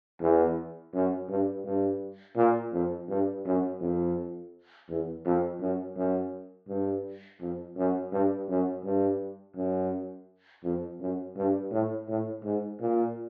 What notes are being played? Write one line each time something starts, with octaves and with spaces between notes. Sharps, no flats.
E2
F#2
G2
G2
A#2
F2
G2
F#2
F2
E2
F2
F#2
F#2
G2
F2
F#2
G2
F#2
G2
F#2
F2
F#2
G2
A2
A2
G#2
A#2